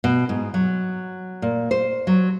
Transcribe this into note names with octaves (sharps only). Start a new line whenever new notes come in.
B2
G#2
F#3
A#2
C5
F#3